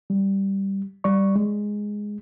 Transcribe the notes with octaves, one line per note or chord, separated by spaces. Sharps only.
G3
G3 D5 C#6
G#3